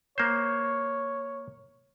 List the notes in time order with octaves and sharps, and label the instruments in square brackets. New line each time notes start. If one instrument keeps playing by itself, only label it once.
[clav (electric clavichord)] A#3 C5 [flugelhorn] C#5